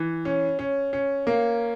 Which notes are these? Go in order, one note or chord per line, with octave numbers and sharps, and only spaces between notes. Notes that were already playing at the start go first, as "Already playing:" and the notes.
Already playing: E3
C#4
C#4
C#4
A#3